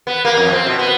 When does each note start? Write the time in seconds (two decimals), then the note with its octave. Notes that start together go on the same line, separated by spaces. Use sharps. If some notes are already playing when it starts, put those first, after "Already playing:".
0.07 B3
0.25 A#3
0.37 F2
0.52 C4
0.66 B2
0.79 B3